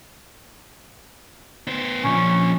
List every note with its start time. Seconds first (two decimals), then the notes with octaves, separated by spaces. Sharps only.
1.67 B3 C5
2.04 A#2 F3 C#4